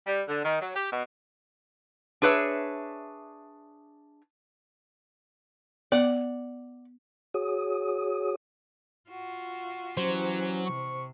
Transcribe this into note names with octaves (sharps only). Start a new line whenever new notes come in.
G3
D3
D#3
F#3
G4
B2
D4 G#4 B4 C#5 E5
B3 D5 F#5
F#4 G#4 C#5 D#6
F4 F#4
E3 F#3 C#4 G4 C5
C3 C#6